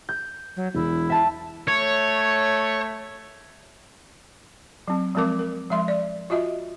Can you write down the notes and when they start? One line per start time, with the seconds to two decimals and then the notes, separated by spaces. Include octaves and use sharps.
0.09 G6
0.56 F#3
0.75 E1 E4
1.10 E5 A5
1.68 A3 C#5
4.88 F#3 C4
5.15 F3 G#3 C4 A#4 D6
5.39 A#4
5.70 F3 G#3 E5 C6
5.88 D5
6.30 F4 F#4 D#5 E5